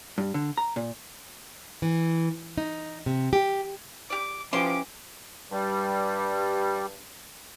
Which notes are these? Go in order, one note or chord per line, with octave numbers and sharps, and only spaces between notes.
G2
D3
A#5
A#2
E3
D#4
C3
G4
G4 D5 D6
E3 F3 C#4 G4 C6 D6
G2 G3